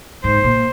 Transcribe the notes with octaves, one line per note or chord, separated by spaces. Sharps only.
G#2 C5
A#2